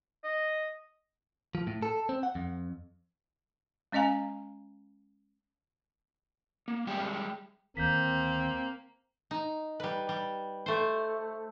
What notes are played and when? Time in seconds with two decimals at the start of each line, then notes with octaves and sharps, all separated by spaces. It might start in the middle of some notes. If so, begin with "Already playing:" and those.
0.24 D#5
1.55 F3
1.67 A2
1.82 A4
2.09 C4
2.23 F#5
2.35 F2
3.92 G#3 C#4 D#5 F5 G#5 A#5
6.68 A#3
6.87 G3 G#3 G4 E5
7.77 D2 D#3 A#3 C4 G6 B6
9.31 D#4
9.80 G3 B4
10.09 G3
10.66 A3 C5